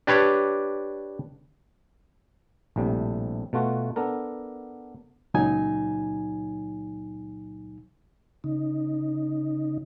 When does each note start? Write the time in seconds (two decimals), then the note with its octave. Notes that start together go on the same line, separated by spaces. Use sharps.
0.07 D4 G4 B4 C#5
2.76 A#1 A2 C3 G3
3.53 B2 A3 F4 F#4
3.96 B3 D4 A4 A#4
5.34 C#2 A#2 F#3 D#4 G#5
8.44 C#3 D#4